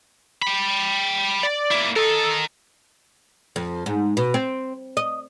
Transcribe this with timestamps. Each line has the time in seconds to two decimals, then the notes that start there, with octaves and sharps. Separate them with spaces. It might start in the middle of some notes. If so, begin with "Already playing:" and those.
0.42 G5 B5
1.43 D5
1.71 A#3 E4
1.96 A4 A#4 D#5
3.56 F2
3.86 G#2
4.17 B2
4.34 C4
4.97 D#5